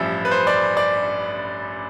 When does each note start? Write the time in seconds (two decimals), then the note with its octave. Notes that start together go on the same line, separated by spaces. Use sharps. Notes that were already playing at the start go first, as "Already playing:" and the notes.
Already playing: A1 G2 F3 E5
0.25 B4
0.31 C5
0.47 D5
0.77 D5